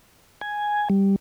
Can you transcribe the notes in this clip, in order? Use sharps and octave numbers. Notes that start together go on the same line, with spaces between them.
G#5
G3